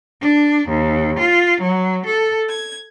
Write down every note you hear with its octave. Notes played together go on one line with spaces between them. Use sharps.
D4
D#2
F4
F#3
A4
G#6